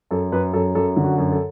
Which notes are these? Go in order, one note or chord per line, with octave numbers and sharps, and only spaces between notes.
F#2 A4
F#2 B4
F#2 A4
F#2 A4
D3
F#4
F#2
A4